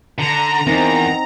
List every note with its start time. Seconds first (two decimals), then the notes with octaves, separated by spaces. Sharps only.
0.18 D3 A#5
0.67 E2 C4 D#4 A#4